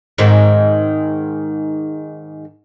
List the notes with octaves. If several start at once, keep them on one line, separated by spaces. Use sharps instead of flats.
G#2 D#3 C4